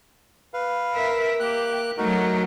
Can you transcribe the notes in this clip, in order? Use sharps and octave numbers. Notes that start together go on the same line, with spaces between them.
B4 F5
A#4 E5
A#3 G4 F#6
F#3 A3 D#4 F#4 A#4